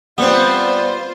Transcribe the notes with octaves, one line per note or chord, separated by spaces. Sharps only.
G3 B3 C4 F4 C5